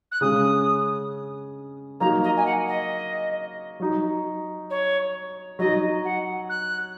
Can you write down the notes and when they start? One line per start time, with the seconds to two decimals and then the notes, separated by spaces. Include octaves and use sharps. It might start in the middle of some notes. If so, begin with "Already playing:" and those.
0.12 F#6
0.21 C#3 G#3 C#4 D#6
2.00 F#3 A#3 D#4 A#5
2.24 D#5
2.37 G#5
2.46 F#5
2.68 D#5
3.80 F#3 D#4
4.70 C#5
5.59 F#3 D#4 D#5
6.05 F#5
6.50 F#6